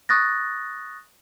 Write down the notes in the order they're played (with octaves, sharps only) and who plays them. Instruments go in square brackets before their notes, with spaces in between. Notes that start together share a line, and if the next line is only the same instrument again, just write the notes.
[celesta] C#6 D#6 F#6 A6 A#6